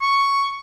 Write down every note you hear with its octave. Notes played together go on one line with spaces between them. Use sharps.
C#6